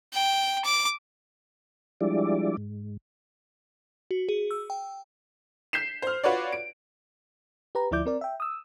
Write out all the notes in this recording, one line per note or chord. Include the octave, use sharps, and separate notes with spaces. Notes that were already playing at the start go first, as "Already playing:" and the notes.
G5
D6
F3 G3 G#3 D4 E4 D5
G#2
F#4
G#4
E6
G5
G6 B6 C7 E7
C5 F6
F4 F#4 B4 C#5 D5
D7
G4 B4 A#5
D2 F3 E4 D5 D6 G6
C4 A#4 D5
E5 G5
D#6 E6